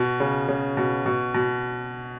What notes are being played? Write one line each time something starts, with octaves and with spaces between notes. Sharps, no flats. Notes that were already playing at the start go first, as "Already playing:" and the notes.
Already playing: B2
C#3
C#3
B2
B2
B2